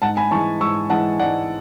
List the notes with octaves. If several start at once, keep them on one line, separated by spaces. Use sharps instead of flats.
G#2 F#5 A5
G#5 B5
E3 G#3 A5 C#6
G#2 C#6 E6
E3 G#3 F#5 A5
G#2 D5 F#5